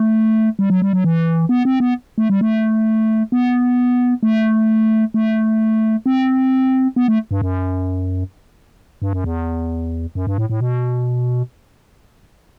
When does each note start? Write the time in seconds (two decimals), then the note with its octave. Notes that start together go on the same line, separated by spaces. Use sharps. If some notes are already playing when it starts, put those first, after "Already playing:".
Already playing: A3
0.59 G3
0.70 F#3
0.82 G3
0.93 F#3
1.04 E3
1.49 B3
1.65 C4
1.80 B3
2.18 A3
2.30 G3
2.41 A3
3.32 B3
4.23 A3
5.14 A3
6.06 C4
6.96 B3
7.08 A3
7.31 G2
7.42 F#2
9.02 G2
9.13 F#2
9.24 E2
10.15 F#2
10.27 G2
10.38 A2
10.50 A2
10.60 B2